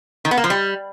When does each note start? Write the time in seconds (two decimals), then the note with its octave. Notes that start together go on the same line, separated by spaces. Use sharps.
0.25 D#3
0.31 B3
0.37 A#3
0.44 F3
0.50 G3